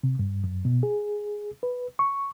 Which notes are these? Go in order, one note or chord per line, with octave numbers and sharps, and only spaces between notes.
C3
G2
F#2
B2
G#4
B4
C#6